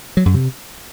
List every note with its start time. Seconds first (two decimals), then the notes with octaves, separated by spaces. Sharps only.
0.17 F#3
0.26 F#2
0.34 C3